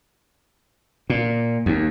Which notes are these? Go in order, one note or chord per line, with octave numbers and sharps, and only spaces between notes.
A#2
D#2